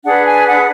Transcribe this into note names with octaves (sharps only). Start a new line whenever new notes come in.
D4 G#4 B4 F#5
G#5
F#5